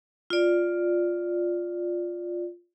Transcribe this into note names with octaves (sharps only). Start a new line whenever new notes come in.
F4 D5